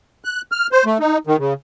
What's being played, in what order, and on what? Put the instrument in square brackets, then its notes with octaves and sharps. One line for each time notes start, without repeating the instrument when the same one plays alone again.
[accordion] F#6
F6
C5
A3
D#4
D#3
C#3